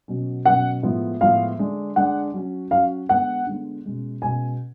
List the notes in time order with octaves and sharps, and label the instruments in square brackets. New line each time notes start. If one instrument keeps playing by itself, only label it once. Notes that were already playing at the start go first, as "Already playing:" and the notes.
[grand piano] B2 F#3 C#4
[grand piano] B2 F#3 C#4 [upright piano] F#5
[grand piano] A2 F3 G#3 B3 F4
[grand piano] A2 F3 G#3 B3 F4 [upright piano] F5
[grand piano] D3 G#3 D4
[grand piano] D3 G#3 D4 [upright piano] F#5
[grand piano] F#3 C#4 F#4
[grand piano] F#3 C#4 F#4 [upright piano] F5
[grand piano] D3 G#3 B3 [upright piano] F#5
[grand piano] D3 G#3 B3
B2 G#3 C#4
[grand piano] B2 G#3 C#4 [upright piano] G#5